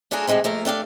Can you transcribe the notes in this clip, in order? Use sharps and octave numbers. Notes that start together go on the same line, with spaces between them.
A3 D4 F4 F#4 G#4 A#4
C3 F3 G#3 A3 C4
F3 A3 A#3 A#4
A3 D4 G4 F5